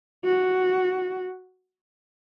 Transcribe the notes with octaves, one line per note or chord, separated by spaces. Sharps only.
F#4